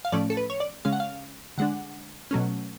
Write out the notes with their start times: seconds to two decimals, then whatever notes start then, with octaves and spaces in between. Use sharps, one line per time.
0.05 F5
0.12 A2 F3 A3 C#4 D5
0.30 A4
0.37 B4
0.50 C#5
0.60 D5
0.85 C#3 G#3 C#4 F5
0.93 F#5
1.00 F5
1.58 D3 G#3 D4 F#5
2.31 B2 F#3 A3 C#4